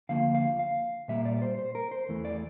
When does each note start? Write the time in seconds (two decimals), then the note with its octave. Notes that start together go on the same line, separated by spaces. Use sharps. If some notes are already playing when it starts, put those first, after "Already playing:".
0.09 D2 D3 F3 A#3 F5
0.35 F5
0.59 F5
1.08 A#2 G3 A#3 E5
1.25 D5
1.37 D5
1.42 C5
1.59 C5
1.75 A#4
1.91 C5
2.09 E2 E3 A3
2.25 D5